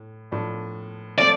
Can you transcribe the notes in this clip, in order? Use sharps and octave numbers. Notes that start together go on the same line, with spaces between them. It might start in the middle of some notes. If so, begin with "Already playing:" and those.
Already playing: A2
A2 F3 D4
F3 A3 C4 F4 D5